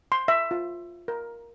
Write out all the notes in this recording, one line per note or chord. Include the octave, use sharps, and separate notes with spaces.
C6
E5
F4
A#4